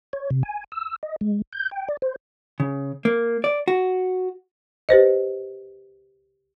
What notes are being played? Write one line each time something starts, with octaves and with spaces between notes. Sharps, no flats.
C#5
C3
G#5
E6
D#5
G#3
G6
G5
D5
C5
C#3
A#3
D5
F#4
G4 B4 C5 D#5